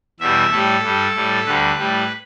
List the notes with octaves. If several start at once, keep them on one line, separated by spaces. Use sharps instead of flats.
E2 B2 G3 E5
A2 G3 A4
G2 G3
A2 G3
D2 D3 G3 B4
A2 G3